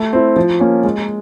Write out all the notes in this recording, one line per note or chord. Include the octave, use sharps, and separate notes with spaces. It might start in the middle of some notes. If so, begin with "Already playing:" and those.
Already playing: A3
C4 E4
F3
A#3 C#4
G#3